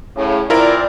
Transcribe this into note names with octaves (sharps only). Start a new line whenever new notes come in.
A2 C#3
E3 C4 E4 F4 A#4 D5